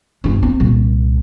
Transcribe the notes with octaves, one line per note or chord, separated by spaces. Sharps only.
G1 D4
C4
C2 A#2